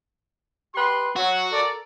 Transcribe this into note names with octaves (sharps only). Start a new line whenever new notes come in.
G4 B4 C6
F#3 F#4
A4 A#4 D5